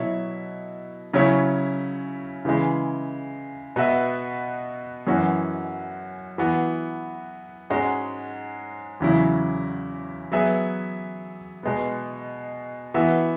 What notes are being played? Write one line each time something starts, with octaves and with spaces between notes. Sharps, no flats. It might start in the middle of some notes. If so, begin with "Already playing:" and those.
Already playing: B2 F#3 E4 C#5 E5
C#3 F#3 C#4 E4 C#5
C#3 E3 G#3
B2 B3 F#4 B4 E5
F#2 E3 C#4 F#4
E3 B3 F#4
G#2 G#3 C#4 F#4
E2 C#3 F#3 C#4 E4
F#3 B3 G#4 E5
B2 G#3 B3
E3 B3 F#4 E5